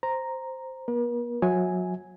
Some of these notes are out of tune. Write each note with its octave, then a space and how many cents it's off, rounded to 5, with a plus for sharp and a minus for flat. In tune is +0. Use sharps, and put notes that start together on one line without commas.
C5 +0 A#5 +0
B3 -45 A#4 +45
F#3 -30 E5 -30 G#5 +0